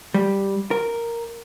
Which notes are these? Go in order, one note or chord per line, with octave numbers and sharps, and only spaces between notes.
G3
A#4